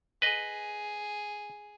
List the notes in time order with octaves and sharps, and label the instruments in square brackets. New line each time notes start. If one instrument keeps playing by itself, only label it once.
[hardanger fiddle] G#4 [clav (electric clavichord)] B4 D#5